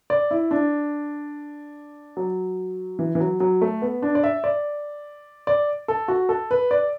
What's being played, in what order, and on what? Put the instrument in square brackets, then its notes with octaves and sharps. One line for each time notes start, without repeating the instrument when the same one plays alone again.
[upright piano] D5
E4
D4
F#3
E3
E3
F#3
F#3
A3
B3
D4
D5
E5
D5
D5
A4
F#4
A4
B4
D5